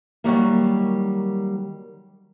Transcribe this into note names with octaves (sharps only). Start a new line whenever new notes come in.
D#3 F#3 G3 A#3